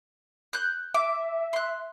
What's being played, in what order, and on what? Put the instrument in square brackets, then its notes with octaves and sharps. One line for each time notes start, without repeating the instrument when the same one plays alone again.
[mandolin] F#6 G6
[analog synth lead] E5 [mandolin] D6
[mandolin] C6 F#6